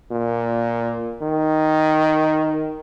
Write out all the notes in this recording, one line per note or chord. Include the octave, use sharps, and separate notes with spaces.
A#2
D#3